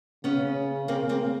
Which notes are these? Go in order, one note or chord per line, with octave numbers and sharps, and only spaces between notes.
C#3 B3 C#4
A#3 C4
A#3 C4